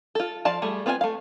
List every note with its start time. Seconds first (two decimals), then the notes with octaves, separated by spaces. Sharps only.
0.15 F4 A4
0.45 F3 F4 D5 F5 A5
0.62 G3 A3 G#4
0.86 B3 C4 F4 A#4 G#5
1.01 A3 F5